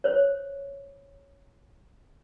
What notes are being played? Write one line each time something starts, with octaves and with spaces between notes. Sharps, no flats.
C5 C#5